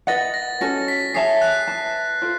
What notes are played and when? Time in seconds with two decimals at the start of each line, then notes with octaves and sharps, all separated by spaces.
0.07 B4 D#5 F#5 A6
0.34 A#6
0.61 C#4 F#4 A4 A#6
0.88 B6
1.14 G#4 C#5 E5 A5 C7
1.42 F#6
1.68 B4 E5 A5
2.22 F4 A4 C5